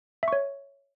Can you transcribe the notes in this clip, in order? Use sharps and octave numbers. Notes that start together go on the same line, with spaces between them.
C#5 E5 C#6